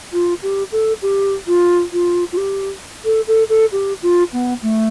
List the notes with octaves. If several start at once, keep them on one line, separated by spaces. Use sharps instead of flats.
F4
G4
A4
G4
F4
F4
F4
G4
A4
A4
A4
G4
F4
B3
A3